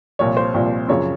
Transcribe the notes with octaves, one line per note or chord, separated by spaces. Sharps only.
C2 A#2 F3 C#5
C5
C2 A#2 F3
F#2 C#3 F3 C#5